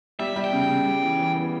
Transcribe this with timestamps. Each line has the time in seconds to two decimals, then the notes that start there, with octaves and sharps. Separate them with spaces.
0.19 G3 E5
0.36 G3
0.44 G5
0.53 C#3
0.69 C#3
0.86 G3
1.02 E3
1.19 E3
1.36 B3